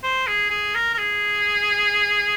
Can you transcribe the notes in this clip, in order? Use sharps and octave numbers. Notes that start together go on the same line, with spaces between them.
C5
G#4
G#4
A#4
A#4
G#4